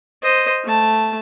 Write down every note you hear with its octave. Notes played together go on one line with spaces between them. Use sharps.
C5 D#5
A3 A5